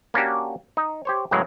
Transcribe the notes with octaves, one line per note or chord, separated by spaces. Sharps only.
A#3 C#4 D4 F#4 G4
D#4
G4 C5 C#5
F#2 A2 C#3 E3 F#3 G#3